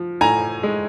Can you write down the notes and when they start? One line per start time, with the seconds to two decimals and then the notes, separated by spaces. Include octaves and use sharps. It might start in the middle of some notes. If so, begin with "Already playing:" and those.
Already playing: F3
0.21 A2 G#5 A#5
0.63 G#3